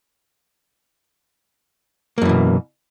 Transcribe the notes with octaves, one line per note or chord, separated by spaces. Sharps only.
F#2 B2 E3 A#3